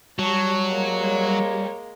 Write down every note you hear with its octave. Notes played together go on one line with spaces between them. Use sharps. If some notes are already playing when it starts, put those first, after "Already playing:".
F#3 G3 C#5 A5 C#6
G#3 A#3